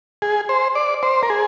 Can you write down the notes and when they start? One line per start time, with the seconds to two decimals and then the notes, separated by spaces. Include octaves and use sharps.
0.22 G#4
0.49 C5
0.75 D5
1.03 C5
1.23 A#4
1.30 G#4